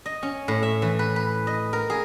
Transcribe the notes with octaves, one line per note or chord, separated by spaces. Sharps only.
D#5
C#4
A2
E5
E3
B4
B4
D#5
A#4
G#4